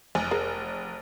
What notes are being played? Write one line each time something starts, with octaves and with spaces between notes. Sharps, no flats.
F1 G#5
G#4 A#4